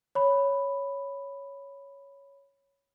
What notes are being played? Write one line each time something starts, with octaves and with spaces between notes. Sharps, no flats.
C#5 B5